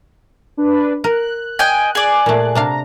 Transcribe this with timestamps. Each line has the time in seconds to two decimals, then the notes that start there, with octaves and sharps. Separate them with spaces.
0.57 D4 B4
1.04 A#4 F#6
1.59 D#5 G5 G#5
1.95 G#4 D5
2.26 A#2 A3
2.55 C3 D4 F5 A#5